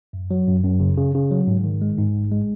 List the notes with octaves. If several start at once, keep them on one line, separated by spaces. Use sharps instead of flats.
F#2
F#3
F#2
F#2
C#3
C#3
C#3
F#3
G#2
D#3
G#3
G#2
A1
G#3